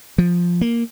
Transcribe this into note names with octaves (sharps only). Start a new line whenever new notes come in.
F3
A#3